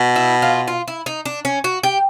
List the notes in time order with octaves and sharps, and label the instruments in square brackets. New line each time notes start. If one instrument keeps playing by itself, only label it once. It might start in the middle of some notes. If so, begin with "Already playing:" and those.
Already playing: [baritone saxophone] B2
[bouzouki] E4
F4
F4
E4
D#4
D4
C#4
F#4
G4